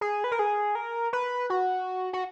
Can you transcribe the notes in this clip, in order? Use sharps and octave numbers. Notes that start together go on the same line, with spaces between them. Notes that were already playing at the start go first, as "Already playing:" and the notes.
G#4
B4
A#4
G#4
A#4
B4
F#4
F#4